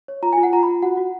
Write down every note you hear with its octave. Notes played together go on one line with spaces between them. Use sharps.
C#5
F4 A#5
G#5
F4
F#5
F4 A#5
B5
F4
F#4 F#5
F#4